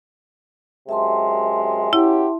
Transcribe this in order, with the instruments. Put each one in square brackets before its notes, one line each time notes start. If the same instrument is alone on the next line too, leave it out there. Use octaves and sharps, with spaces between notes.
[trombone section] F#2 C3 G#3 [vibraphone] E5 A5 C6
[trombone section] C#4 F#4 G4 [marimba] E4